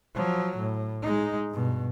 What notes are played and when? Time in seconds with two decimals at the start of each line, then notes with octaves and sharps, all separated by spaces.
0.15 F3 F#3
0.57 A2
1.02 G#3 D#4
1.51 G2 B2